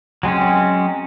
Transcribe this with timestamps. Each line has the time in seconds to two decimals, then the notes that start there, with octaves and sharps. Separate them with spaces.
0.23 F#3 G#3 C4 C#4